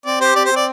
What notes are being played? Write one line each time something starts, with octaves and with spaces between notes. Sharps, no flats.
C4 D5
G4 C5
C4 D5
C5
C4
D5